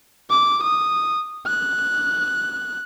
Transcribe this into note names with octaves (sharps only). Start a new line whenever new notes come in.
D6
D#6
F#6